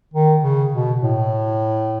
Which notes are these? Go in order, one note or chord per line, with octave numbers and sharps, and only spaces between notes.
D#3
C#3
B2
A2